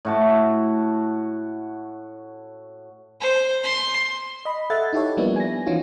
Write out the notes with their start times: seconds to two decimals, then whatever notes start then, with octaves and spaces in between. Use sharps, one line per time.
0.05 A2 F#4 A5
3.21 C5
3.63 C6
4.45 D#5 B5
4.70 A4 E5 F#5 G#6 A6
4.93 D#4 E4 G4 A4 C#5
5.17 F3 G3 A#3 B3 D4 E4
5.36 G#5 A#6
5.66 E3 F3 C#4 D#4 F4 F#4